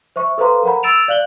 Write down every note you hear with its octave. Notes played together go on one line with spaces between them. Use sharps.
C5 E5 C#6
A4 B4 C5 F5 A#5 C6
A#4 C5 F#5 A#5 B5
E6 A6 D7 E7 F7
D5 F5 F#6 F#7 G7